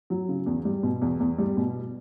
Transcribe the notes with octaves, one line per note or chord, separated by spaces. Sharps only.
F#3
C#3
E2
G3
B2
E2
E2
G3
B2